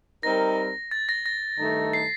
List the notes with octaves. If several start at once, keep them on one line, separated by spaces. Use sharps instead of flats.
G3 C4 D#4 A#4 A#6
A6
A#6
A#6
G2 D#3 A3 D#4 A4
C7